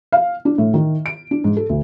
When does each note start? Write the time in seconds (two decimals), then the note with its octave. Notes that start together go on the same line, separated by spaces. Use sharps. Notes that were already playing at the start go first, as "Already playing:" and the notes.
0.12 F5
0.45 D4
0.58 A2
0.74 D#3
1.06 D7
1.31 D4
1.44 G#2
1.57 A4
1.69 D2